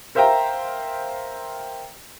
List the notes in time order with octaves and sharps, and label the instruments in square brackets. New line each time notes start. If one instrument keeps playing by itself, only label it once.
[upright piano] A#4 C5 E5 F5 G5 A#5